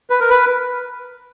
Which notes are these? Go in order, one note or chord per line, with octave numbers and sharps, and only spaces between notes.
B4
A#4
B4